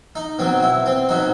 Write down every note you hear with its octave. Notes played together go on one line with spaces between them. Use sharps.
D#4
B2 F#3 C4
E4
C4
B2 F#3 D#4